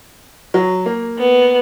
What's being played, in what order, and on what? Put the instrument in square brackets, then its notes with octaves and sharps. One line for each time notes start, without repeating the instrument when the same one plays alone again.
[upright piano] F#3
A#3
[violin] B3